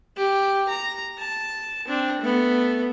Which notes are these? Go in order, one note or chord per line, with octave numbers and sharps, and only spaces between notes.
G4
A#5
A5
C4 D4
A3 B3